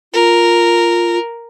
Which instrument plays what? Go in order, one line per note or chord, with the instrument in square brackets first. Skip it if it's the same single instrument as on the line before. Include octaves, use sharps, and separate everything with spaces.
[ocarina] F4 [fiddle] A#4